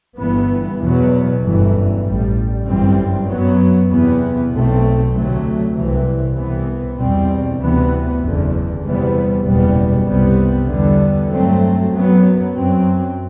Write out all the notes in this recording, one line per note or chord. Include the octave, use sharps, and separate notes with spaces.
G1 G2 E3 B3
E2 B2 F#3 B3
G1 F#2 E3
A1 A2 G3
G1 F#2 E3 G3 C4
F#2 F#3 B3
E2 C3 E3 B3
B1 B2 A3 C4
D2 C3 F#3 A3
C2 C3 E3
C2 C3 E3 B3
E2 B2 G3 C4
D2 C3 E3 B3
F#1 E2 D3
E2 C3 E3 G3 B3
F#1 E2 B2 G3 B3
C2 C3 G3 B3
E2 D3 G3 B3
G2 F#3 A3 C4
F#2 F#3 B3
F#2 F#3 C4